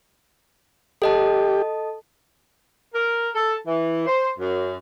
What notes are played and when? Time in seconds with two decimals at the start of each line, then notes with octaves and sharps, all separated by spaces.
1.02 G4 A4 D#5 A5
2.93 A#4
3.33 A4
3.66 E3
4.06 C5
4.38 F#2